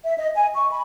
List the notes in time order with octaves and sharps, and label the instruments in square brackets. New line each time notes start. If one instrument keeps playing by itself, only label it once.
[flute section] E5
D#5
G#5
C#6
B5